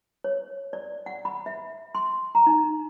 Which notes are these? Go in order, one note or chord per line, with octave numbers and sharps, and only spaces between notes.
C#5
D5
F#5
B5
E5
C6
A#5
D#4